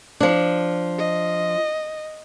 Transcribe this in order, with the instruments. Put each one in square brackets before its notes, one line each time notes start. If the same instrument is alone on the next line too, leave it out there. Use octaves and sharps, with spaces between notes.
[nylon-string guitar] F3 D4
[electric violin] D#5